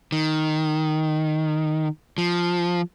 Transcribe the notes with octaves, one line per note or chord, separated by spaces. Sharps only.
D#3
F3